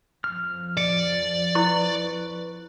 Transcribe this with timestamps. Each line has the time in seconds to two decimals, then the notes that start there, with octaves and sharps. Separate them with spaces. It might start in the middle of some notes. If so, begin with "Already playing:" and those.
0.24 F2 F3 F6
0.77 D5 C#7
1.55 E4 B4 C#6